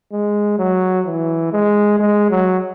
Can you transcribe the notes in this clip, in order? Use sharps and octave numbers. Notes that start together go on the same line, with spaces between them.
G#3
F#3
E3
G#3
G#3
F#3